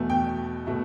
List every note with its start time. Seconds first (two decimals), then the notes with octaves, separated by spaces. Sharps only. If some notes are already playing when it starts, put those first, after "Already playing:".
Already playing: E2 B2 A3
0.10 G5
0.67 B2 A3